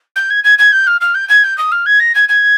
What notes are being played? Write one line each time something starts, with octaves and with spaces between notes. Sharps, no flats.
G6
G#6
G#6
G#6
G6
F6
F6
G6
G#6
G6
D#6
F6
G#6
A#6
G#6
G#6